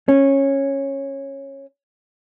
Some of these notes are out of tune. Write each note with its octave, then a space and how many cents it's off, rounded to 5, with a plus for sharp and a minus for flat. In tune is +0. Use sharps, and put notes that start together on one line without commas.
C#4 -15